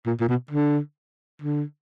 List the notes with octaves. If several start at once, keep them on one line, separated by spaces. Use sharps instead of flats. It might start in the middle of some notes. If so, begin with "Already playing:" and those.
A#2
A#2
B2
D3
D3